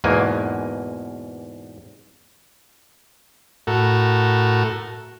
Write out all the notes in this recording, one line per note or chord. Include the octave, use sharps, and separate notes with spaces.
E2 G#2 B2 A#3 G#5
A2 F#4 A4 A#4